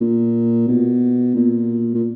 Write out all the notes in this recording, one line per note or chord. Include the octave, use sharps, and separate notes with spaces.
A#2
B2
A#2
A#2